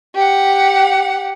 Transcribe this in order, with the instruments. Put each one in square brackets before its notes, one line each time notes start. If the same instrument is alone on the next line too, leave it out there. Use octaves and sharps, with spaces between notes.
[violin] G4 F#5